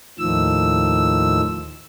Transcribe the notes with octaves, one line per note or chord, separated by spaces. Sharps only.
D#2 A2 D#3 F3 E6